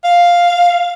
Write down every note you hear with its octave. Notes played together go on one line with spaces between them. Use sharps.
F5